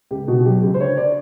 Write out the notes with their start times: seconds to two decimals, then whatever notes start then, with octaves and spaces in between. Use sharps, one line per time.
0.11 C#2 G4
0.28 B2 F#4
0.45 F#3 G4
0.62 C#2 G4
0.74 C5
0.80 D3 C#5
0.97 D5